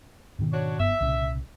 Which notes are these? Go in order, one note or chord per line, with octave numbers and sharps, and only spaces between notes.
G#2 B2 D#3
D4 F#4 C#5
F#1 G2 B3 E5
C2 A#2 C#3